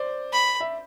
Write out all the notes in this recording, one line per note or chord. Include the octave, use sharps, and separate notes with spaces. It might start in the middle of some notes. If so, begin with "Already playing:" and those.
Already playing: C5 D5
B5
E5